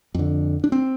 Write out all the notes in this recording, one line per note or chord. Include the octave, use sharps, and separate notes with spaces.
F2 D3
D4
C4